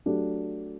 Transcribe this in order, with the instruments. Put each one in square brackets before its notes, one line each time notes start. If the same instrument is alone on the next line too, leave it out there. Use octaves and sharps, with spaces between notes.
[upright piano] F#3 A3 D4 G4